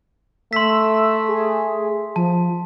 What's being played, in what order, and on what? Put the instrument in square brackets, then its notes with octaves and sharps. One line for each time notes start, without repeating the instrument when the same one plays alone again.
[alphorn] A3 [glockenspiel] C6 B6 [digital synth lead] E6
[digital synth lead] G#4
[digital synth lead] F3 [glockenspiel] A5